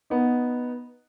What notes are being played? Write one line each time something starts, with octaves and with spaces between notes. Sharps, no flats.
B3 D#4